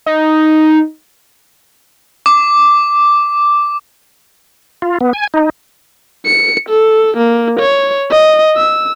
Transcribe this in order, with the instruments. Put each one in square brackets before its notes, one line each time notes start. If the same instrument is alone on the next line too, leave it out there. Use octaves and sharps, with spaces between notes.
[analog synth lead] D#4
[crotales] D6
[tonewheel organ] F4
B3
G#5
D#4
[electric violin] C#7
A4
A#3
C#5
D#5
E6